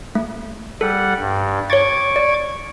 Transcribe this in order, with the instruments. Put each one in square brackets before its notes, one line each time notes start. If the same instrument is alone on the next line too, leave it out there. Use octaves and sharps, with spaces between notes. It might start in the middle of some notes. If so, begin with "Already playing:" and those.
[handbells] A3
[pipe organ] G3 F#5 [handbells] A4
[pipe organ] G2
[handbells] C#5 A6 [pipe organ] C#6 D6 G#6
[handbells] D5